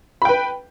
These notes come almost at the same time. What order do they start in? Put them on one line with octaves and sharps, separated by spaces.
B5 G5 B4